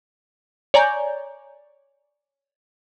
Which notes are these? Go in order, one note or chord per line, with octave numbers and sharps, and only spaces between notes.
C#5 D5 G#5 A#5 G6